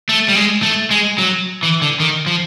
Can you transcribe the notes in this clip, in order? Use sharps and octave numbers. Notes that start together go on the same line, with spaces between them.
A3
G3
G#3
A3
G#3
F#3
E3
D3
D#3
F3